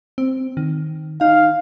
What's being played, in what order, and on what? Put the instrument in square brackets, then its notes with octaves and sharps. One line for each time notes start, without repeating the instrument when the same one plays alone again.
[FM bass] C4
D#3
[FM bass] D#4 [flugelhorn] F5